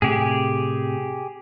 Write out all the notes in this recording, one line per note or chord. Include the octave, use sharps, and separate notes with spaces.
A2 C3 G4 G#4